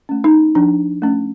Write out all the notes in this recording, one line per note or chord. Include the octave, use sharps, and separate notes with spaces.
A3 C#4
D#4
F3 D4
A3 C#4